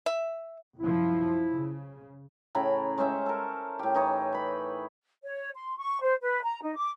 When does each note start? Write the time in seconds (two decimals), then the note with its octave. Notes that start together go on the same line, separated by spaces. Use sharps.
0.06 E5
0.79 C2 F#2 F3 E4
1.53 C#3
2.55 A2 C#3 A#5 B5
2.98 G#3 C#4 C5 E5
3.26 A4 A#4
3.79 A2 G4
3.94 E3 D#4 C#5
4.32 B4 B5
5.23 C#5
5.55 C6
5.78 C#6
6.01 C5
6.22 B4
6.43 A#5
6.63 D#4
6.76 D6